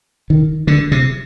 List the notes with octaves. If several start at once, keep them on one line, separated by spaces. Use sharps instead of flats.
D#3
D3
C3